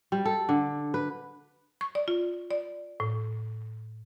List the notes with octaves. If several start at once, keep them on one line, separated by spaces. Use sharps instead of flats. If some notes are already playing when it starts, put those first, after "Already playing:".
G3
A4
D3
B4
C#6
D5
F4
D5
A2